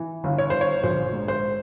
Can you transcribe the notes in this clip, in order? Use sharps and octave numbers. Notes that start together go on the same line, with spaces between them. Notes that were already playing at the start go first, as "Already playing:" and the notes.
Already playing: E3
G1
C#5
G1 C5
C#5
A#1 C5
G#2
C5